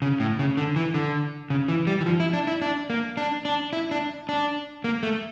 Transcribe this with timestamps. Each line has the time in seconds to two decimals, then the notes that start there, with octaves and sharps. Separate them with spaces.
0.02 C#3
0.20 A2
0.39 C#3
0.57 D3
0.76 E3
0.94 D3
1.50 C#3
1.68 E3
1.87 G3
2.01 E3
2.06 F3
2.20 E4
2.33 D4
2.47 E4
2.62 D4
2.90 A#3
3.17 D4
3.45 D4
3.73 E4
3.91 D4
4.29 D4
4.84 A#3
5.03 A3